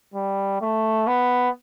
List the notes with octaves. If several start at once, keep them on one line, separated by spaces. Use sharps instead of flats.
G3
A3
B3